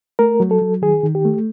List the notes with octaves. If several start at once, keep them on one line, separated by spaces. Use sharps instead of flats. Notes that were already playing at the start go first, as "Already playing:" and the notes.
A3 A#4
F#3
A4
F#3
D#3 G#4
D#3
G4
A3